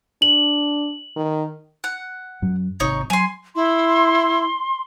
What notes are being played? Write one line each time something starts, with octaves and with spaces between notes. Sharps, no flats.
D4 F#7
D#3
F#5
F#2 F#3
G#1 C3 D#4 C#5
F#3 G#5 C6
E4 C6